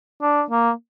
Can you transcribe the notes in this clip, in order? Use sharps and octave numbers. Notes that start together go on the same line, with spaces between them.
D4
A#3